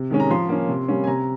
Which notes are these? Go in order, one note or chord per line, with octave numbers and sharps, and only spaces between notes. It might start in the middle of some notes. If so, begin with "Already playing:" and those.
Already playing: C3
D#3 G#3 C#4
A#5
F3 C6
A#3 C#4
C3
G3 A#3 C#4
G#5
C3 A#5